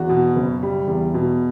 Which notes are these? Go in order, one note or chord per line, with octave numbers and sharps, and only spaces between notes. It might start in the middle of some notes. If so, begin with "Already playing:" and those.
Already playing: E2 F#4
B2
F#1
G3
E2
B2